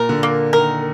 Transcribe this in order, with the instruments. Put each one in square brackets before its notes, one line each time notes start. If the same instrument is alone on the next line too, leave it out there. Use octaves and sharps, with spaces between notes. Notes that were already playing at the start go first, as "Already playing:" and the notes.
Already playing: [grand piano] A#2 [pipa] A#4
[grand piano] D3
[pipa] A#3
[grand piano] D#3 [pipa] A#4